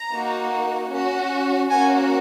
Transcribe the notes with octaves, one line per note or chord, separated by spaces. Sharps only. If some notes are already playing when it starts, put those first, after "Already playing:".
Already playing: A#5
A#3 D#4 F#4
C#4 F#4
A#3 C#4 F#4 G#5